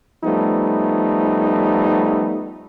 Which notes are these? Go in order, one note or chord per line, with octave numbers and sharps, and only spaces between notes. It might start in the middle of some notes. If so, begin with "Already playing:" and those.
F3 G3 A3 B3 D#4